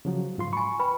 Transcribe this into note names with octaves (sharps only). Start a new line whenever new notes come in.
C#3 F3 F#3
G#2 F4 C6
G#5 B5 C#6
B4 G5 B5